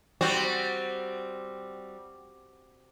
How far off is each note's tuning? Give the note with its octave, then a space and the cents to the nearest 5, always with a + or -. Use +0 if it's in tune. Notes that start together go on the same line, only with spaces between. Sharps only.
G3 +0 C4 +0 F#4 +0